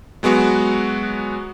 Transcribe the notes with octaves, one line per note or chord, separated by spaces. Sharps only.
F#3 G#3 B3 F#4